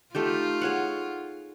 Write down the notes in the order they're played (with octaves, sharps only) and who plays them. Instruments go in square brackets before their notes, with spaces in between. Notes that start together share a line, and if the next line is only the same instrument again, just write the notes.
[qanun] A3 D#4 G4 [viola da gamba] F4
[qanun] G#4 C#5 F#5